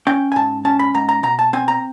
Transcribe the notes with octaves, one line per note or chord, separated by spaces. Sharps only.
C#4 G5
G#5
G#2 A5
C#4 A5
B5
G#2 A#5
A#5
B2 A#5
A5
C4 G#5
A#5